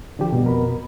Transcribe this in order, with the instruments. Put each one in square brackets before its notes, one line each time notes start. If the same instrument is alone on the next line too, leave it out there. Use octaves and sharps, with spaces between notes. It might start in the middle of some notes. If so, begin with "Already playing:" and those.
[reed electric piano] D3 F3 G4
[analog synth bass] B2 [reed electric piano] G3
[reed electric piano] F2 A#4 B5